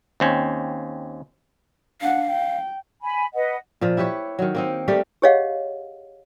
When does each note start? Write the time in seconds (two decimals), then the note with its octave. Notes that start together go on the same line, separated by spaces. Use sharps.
0.20 D#2 C4 C#4
2.01 D4 F5 F#5
2.30 G5
3.01 G#5 B5
3.34 B4 D#5 F#5
3.81 A#2 F3
3.97 E4 G4 B4 C#5
4.39 D#3 F#3
4.55 A#3 C4 D#4
4.88 G3 A3 G4 A#4
5.22 G4 G#4 C#5 D#5 F5 F#5